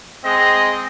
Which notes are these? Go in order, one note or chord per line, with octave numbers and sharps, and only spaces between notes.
G#3 C4 D#5